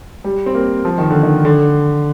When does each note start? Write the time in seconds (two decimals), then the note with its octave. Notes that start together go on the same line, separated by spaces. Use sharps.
0.24 G3
0.46 C4
0.55 A#3
0.85 F3
0.98 D#3
1.11 D3
1.23 D#3
1.45 D3